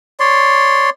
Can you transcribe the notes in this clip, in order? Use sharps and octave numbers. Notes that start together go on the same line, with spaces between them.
C#5 D5 C6